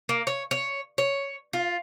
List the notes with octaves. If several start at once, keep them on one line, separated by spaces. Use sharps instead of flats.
A#3
C#5
C#5
C#5
F4